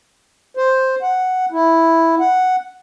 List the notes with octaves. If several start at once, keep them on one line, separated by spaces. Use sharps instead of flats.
C5
F#5
E4
F#5